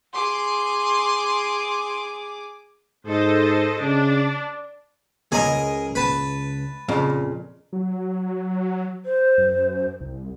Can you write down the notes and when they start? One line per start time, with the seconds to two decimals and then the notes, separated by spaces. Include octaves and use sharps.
0.13 G#4 C6 D6
3.07 G#2 A4 C5 D#5
3.81 C#3 D4
5.32 C#2 G#4 A#4 D#5
5.95 B4 A5
6.88 F2 A#2 C#3
7.73 F#3
9.05 C5
9.38 F#2
10.01 C2